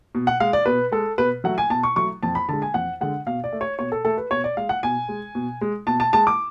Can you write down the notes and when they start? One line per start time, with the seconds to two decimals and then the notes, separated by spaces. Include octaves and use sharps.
0.15 B2
0.27 F#5
0.40 G#3 F5
0.53 D5
0.66 B2 B4
0.92 G#3 A4
1.18 B2 B4
1.44 F#3 A3 F#5
1.58 G#5
1.70 B2 A5
1.83 C#6
1.96 F#3 A3 C#6
2.23 F2 A5
2.35 B5
2.49 D3 G#3 A5
2.62 G#5
2.74 F2 F#5
3.01 D3 G#3 F#5
3.26 B2 F5
3.44 D5
3.52 A3
3.61 C#5
3.79 B2 C#5
3.92 A4
4.04 A3 A4
4.17 B4
4.31 B2 C#5
4.44 D5
4.57 G#3 F5
4.69 F#5
4.83 B2 G#5
5.09 G#3
5.35 B2
5.61 G#3
5.87 B2 A5
6.00 A5
6.13 G#3 A5
6.27 D6